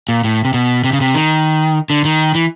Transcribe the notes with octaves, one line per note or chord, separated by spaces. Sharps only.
A#2
A2
C3
B2
C3
C#3
C3
D#3
D3
D#3
E3